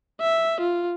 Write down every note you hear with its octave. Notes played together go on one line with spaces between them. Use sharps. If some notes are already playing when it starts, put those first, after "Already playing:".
E5
F4